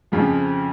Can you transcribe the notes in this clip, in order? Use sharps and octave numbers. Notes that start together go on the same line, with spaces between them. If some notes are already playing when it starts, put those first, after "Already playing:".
F2 C#3 F3 F4